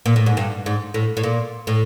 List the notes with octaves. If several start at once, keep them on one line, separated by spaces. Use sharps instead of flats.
A#2
A2
G#2
G2
G#2
A2
A2
A#2
A2